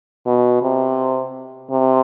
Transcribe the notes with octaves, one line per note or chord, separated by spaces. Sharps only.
B2
C3
C3